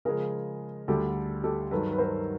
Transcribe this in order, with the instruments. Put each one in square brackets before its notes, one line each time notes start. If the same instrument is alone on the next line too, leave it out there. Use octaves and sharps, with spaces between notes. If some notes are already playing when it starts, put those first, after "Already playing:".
[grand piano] C#3 F3 G#3 [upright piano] G#4 A#4
[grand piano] D2 D3 G3 [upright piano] G4 A4
[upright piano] G4 A4
[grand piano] G2 D#3 F#3 [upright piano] A4 B4
[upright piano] B4
A#4 C5